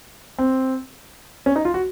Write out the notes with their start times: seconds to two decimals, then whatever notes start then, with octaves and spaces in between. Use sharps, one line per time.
0.38 C4
1.46 C#4
1.56 D#4
1.65 F4
1.74 F#4